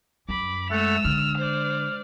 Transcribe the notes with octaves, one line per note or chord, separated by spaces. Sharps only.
F#2 B5 D6
G#3 A3 A4 F#5 E6 F7
D3 F6
C5 D5